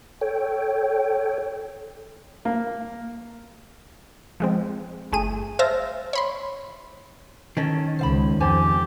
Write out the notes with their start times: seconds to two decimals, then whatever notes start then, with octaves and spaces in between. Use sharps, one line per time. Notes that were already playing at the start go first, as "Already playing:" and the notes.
0.21 A4 C#5 G5
2.45 A#3
4.40 F3 G#3 C4
5.12 G1 A3 G#4 D#7
5.59 C5 E5 F5 A5 A#6
6.13 C#5 B5 C6
7.57 D#3 C#4 A4 C#5 D#5
7.99 C#2 C5 F5 B5
8.40 F2 G4 A4 C5 G#5